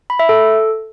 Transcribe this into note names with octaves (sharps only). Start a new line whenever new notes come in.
B5
E5
A4